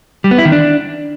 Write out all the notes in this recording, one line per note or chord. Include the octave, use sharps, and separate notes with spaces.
G3
B3
E4
D#3
D4